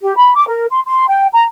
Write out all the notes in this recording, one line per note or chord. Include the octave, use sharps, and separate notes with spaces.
G4
B5
D6
A#4
C6
C6
G5
A#5